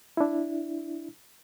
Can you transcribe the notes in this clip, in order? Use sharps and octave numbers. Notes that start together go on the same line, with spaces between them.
D4 E4